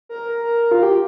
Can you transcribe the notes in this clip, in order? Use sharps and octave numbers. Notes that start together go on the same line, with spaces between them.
A#4
F4
G4